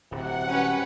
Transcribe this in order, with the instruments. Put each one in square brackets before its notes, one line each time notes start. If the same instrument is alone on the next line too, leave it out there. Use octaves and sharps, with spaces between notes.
[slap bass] D1 [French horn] C3 [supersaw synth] F#5
[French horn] G3 [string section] C#4 B4